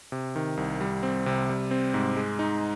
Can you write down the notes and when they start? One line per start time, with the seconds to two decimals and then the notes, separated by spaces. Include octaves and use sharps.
0.12 C3
0.36 D#3
0.57 C2
0.81 G3
1.03 C4
1.26 C3
1.49 G3
1.71 C4
1.94 G#2
2.17 G#3
2.39 D#4